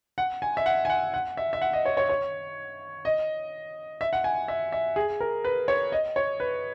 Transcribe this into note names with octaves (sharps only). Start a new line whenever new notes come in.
F#5
G#5
E5
F#5
G#5
F#5
F#5
E5
E5
F#5
D#5
C#5
C#5
C#5
D#5
E5
F#5
G#5
E5
E5
G#4
A#4
B4
C#5
D#5
C#5
B4